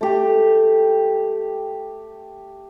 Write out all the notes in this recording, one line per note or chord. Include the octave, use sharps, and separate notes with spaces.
A3 G4